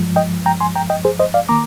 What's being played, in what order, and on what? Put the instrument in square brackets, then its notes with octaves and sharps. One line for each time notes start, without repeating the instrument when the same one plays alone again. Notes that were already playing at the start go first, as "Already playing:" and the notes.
Already playing: [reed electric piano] G2 F3 G#3
D#5 G5
G5 A#5
G#5 C6
G5 A#5
D#5 G5
G#4 C5
C5 D#5
D5 F5
D#3 A#3 A#5 D6